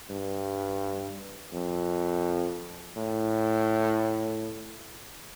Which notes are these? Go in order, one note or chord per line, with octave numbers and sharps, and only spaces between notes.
G2
F2
A2